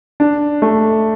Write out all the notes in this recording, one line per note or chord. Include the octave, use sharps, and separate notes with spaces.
D4
A3